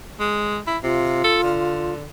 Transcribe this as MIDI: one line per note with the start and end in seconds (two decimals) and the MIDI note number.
0.20 0.59 56
0.67 0.77 64
0.83 1.21 48
0.83 1.93 65
1.24 1.39 69
1.43 2.06 50